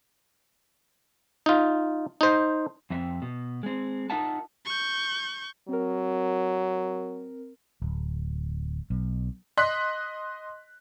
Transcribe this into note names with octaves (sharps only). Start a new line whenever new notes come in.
D#4 F4
D#4 C5
F2 C4 E5
B2
G#3 C4
D#4 F4 A#4 E5 F#5 A5
C#6 G6
F#3 C4 A#4
D1
B1
D#5 C6 F#6 B6